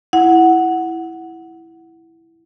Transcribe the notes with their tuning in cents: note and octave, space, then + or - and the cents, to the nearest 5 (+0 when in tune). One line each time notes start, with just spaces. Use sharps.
E4 +0 F#5 +0